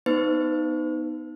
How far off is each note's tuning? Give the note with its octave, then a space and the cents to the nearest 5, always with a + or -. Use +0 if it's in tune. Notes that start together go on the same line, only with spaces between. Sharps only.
B3 +0 D#4 +0 C5 -45